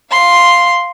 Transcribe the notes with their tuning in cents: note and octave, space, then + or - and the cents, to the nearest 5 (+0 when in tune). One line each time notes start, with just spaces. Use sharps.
F5 +0 C6 +0